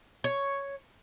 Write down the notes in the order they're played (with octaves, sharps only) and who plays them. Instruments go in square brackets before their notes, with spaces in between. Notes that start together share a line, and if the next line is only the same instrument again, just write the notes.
[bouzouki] C#5